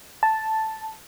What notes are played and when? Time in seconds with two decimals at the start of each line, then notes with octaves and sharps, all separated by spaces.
0.23 A5